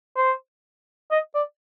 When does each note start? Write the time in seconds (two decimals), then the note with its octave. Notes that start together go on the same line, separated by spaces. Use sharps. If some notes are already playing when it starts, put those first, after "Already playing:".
0.17 C5
1.11 D#5
1.35 D5